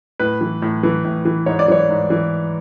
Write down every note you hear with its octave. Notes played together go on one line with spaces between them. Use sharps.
A2 B4
E3
A2
E3
A2
E3
G#2 C#5
D5
E3 C#5
G#2
E3